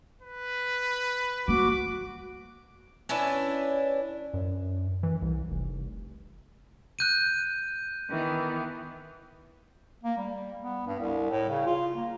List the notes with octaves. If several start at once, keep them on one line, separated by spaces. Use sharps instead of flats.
B4
A#3 F#4 D6
C#4 D4 E4 B4
F#2
E3
C2
F1
F#6 G6 D#7
D#3 E3 B3
A#3
G3
B3
G2
C2
A2
C#3
F4
A#3